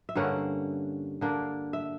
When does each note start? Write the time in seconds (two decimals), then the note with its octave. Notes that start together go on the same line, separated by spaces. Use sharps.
0.09 E5
0.15 G2 D3 A#3 C#4 F#5
1.21 D3 A#3 D4
1.73 E5